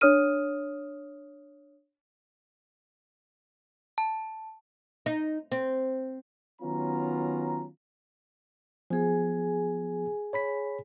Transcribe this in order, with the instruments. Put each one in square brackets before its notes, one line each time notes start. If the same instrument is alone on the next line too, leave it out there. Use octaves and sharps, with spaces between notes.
[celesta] D4 C#5 D#6 F6 D#7
[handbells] A5
[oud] D#4
C4
[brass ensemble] D#3 F#3 B3 C#4 F4 A#5
[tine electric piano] F3 B3 [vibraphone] G#4 G#5
[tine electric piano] C#5 B5 B6